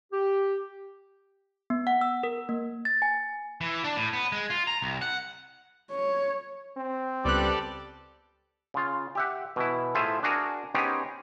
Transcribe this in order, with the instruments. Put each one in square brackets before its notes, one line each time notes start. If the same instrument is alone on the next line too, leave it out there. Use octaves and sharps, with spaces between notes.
[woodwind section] G4
[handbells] B3
F#5
E6
A#4
A#3
A6
G#5
[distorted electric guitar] E3
D4
A2
B3
G#3
F4
A#5
C2
F#5
[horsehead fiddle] C#5
[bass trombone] C4
[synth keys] C#2 B3 F#6 [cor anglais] G3 [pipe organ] G4 A4 D5
[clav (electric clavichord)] C#3 F4
G4 E5 F#5
B2 E3 E4
A2 F4 G#4 C5 E5
D4 F#4 G#4 A#4
B3 C#4 D#4 G4 G#4 C5